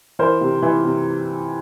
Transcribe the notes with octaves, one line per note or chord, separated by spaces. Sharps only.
E3 A#4 C5
C3
E3
C3